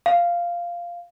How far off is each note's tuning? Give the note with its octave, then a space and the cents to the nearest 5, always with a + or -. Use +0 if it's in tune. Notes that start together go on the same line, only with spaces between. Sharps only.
F5 -5